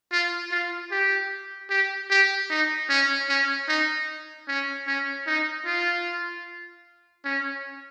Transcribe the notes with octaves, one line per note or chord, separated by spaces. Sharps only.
F4
F4
G4
G4
G4
D#4
C#4
C#4
D#4
C#4
C#4
D#4
F4
C#4